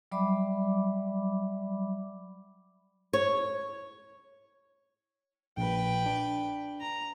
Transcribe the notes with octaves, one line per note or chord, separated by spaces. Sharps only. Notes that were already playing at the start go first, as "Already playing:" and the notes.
F#3 G3 D5 E5 B5 D6
C#5
A#1 B4 G5
D4
A#5